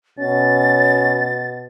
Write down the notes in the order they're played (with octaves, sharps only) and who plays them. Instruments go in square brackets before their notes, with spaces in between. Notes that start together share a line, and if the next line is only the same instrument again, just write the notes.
[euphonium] B2 [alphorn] C#4 [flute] A6